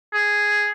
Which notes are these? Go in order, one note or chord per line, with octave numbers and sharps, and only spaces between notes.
G#4